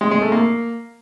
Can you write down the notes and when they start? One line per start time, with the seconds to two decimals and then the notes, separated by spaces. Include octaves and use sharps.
0.01 G#3
0.11 G#3
0.22 A3
0.32 A#3